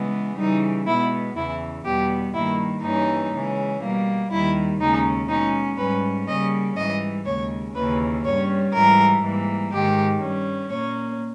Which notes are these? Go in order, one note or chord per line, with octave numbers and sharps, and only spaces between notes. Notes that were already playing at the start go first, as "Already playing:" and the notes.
Already playing: C#3 E3 G#3 B3
C#3 E3 G3 D#4
B2 G#3 B3 E4
E2 C#3 E3 E4
E2 B2 G3 B3 G4
G2 D#3 A#3 E4
G2 E3 G3 A#3 C#4 D#4
C#3 E3 G#3 C#4
B2 G3 A#3
D#2 D#3 G3 E4
D#2 C#3 G#3 C#4 D#4
B2 G#3 C#4 D#4
G#2 G3 C#4 B4
C#3 G3 A#3 C#4 D#5
G#2 E3 G3 D#5
D#2 C#3 G#3 C#5
D#2 C#3 E3 A#3 C#4 B4
G2 G3 C#4 C#5
G#2 E3 G3 A#4
G#2 E3 G3 A#3
G#2 D#3 G#3 G4
G2 G3 C#4
A#2 A#3 C#4 C#5